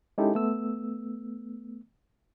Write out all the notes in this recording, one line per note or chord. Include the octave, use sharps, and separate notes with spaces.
G#3 C#4 D#4 E4 G4 A4
A3 B3 E6